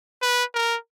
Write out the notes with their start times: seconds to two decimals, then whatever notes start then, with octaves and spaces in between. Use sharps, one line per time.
0.22 B4
0.54 A#4